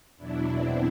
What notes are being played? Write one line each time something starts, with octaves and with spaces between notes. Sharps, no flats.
E2 B2 F#3 D4 E4
C4 D4